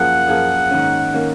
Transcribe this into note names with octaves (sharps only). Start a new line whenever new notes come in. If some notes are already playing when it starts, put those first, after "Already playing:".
Already playing: F#2 F3 A#3 F4 G#4 F#5
F#2 F3 A#3 F4 G#4
G#2 D#3 A#3 C#4
D#3 A#3 C#4